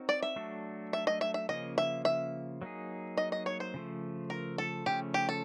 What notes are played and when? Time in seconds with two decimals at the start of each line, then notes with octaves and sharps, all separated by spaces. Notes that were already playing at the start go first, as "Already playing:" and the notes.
Already playing: C4 D#4 F#4 A#4 C#5
0.09 D5
0.23 E5
0.36 F#3 A3 D4 F#4 A4
0.93 E5
1.07 D#5
1.21 E5
1.34 E5
1.49 C#3 F3 A#3 C#4 D#5
1.78 E5
2.05 E5
2.62 F#3 A#3 D#4 G#4
3.18 D#5
3.32 D#5
3.46 C#5
3.60 C5
3.74 C#3 F3 A3
4.30 A#4
4.58 A4
4.86 C#3 F3 A3 C#4 G4
5.14 G4
5.29 A4